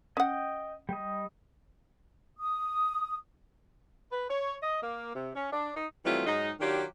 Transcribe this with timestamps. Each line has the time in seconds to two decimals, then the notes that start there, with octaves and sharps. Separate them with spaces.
0.17 C#4 D#5 F#5 G5
0.89 G3 D#5
2.38 D#6
4.11 B4
4.29 C#5
4.62 D#5
4.83 A#3
5.13 C3
5.35 C#4
5.52 D4
5.76 D#4
6.05 E3 F#3 G3 A3 C4 F4
6.27 G#2 F#3 G#3 D#4
6.60 D#3 F#3 D4 F4 G4